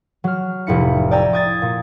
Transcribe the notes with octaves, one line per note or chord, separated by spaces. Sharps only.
F#3 F6
F1 A2 E4 C#7
D5 G5 G#5 A#5 E6
D6 D#6 G#6 A6
A#2